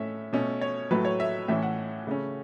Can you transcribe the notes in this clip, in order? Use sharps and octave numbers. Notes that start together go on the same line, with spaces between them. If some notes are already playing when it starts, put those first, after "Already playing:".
Already playing: A2 A3 C#4 E5
B2 A3 C#4
C#5
A2 F#3 A3 B4
C#5
E5
A2 E3 C#4 E5
F#5
C#3 A3 C#4